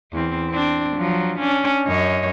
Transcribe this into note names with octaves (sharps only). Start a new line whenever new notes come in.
E2 C4
C4 D4
F3 F#3
C#4 D4
F#2 C#5 D#5